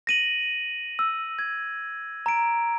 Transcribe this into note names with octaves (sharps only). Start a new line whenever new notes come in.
A#6 D#7 F#7
E6
G#6
A#5 D7